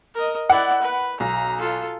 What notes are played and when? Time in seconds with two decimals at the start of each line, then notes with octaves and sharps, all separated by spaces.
0.15 A#4 D#5
0.50 E4 D5 F#5
0.82 B4
1.20 B1 A#5
1.59 F4 A4